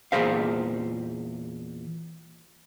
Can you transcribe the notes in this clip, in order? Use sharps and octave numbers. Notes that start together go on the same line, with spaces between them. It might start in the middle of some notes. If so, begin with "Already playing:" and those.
E2 A#2 F#3 G#4 C5 F5